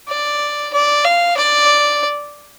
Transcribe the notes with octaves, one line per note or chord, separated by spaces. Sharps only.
D5
D5
F5
D5